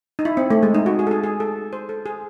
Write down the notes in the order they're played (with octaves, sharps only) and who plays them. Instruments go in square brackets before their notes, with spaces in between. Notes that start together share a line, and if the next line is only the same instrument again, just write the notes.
[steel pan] D#4
E4
C4
A3
G#3
D#4
F#4
G#4
A4
G#4
G#4
A4
C5
A4
G#4